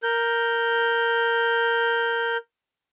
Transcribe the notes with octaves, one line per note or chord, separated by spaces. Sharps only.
A#4 G6